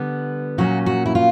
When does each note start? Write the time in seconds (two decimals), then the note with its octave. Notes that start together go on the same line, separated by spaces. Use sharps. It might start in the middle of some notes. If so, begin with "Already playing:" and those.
Already playing: D3 G3 B3
0.58 A#2 F#3 A#3 C#4 F#4
0.86 F#4
1.06 E4
1.15 F4